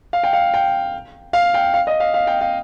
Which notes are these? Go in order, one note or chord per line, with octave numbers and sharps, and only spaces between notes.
F5
G5
F5
G5
F5
G5
F5
D#5
F5
F5
G5
F5